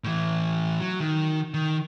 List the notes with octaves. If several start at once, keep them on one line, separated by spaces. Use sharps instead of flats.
A2 E3
F#3
D#3
D#3